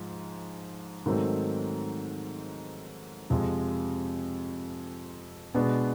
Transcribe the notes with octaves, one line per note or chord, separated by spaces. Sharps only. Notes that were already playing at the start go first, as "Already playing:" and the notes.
Already playing: G#2 F3
G#2 D#3 F#3 A3 C4
F2 C3 F3 G#3
B2 G#3 B3 D4